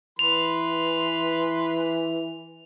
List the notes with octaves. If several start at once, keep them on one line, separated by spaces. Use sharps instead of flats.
E3 B4 C6 F7